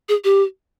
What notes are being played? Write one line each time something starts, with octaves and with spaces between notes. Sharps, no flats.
G#4
G4